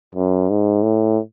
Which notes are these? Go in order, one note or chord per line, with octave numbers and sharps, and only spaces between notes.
F#2
G#2
A2